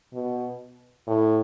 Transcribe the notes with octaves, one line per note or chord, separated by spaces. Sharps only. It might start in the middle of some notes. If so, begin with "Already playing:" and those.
B2
A2